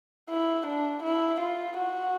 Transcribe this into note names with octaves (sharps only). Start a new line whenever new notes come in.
E4
D4
E4
F4
F#4